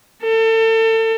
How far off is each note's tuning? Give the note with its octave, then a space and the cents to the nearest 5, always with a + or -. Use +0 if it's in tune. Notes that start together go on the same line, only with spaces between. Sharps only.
A4 +35